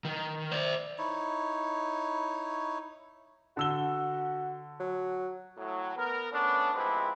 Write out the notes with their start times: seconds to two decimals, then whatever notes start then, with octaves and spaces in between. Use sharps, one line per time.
0.05 D#3
0.52 C5 D5
0.98 D#4 E4 C#5
3.57 D3 F#4 E6 G7
4.80 F#3
5.57 A2 F#3
5.97 B3 A#4
6.32 A3 B3 C#4 D4
6.74 F3 G#3 C4 E4 G4 B4